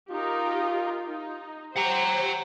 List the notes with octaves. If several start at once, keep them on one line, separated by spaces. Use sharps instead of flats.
D#4 F4 G4 A#4
D#4
G4 C5 F#5 A#5